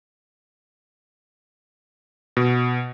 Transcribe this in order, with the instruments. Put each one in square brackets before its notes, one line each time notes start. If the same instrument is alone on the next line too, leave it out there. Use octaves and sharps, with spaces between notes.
[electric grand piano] B2